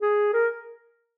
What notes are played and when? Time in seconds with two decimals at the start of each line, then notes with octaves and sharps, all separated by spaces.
0.02 G#4
0.33 A#4